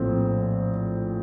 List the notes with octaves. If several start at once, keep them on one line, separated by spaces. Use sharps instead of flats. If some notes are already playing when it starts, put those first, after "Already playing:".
Already playing: A#1 A2 A3 C4